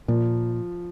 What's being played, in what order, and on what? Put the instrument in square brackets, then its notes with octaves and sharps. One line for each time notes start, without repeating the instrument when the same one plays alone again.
[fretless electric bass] A#2 [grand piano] F3